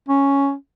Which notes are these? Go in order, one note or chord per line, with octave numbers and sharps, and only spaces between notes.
C#4